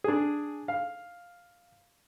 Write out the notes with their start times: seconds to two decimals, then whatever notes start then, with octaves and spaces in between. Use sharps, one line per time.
0.04 D4 G#4
0.68 F5